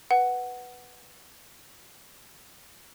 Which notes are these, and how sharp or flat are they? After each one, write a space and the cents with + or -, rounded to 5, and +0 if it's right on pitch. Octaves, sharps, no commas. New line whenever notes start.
B4 +0 F#5 +0